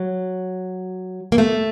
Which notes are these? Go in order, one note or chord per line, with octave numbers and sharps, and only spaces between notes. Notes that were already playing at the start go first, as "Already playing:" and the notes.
Already playing: F#3
A#3
A3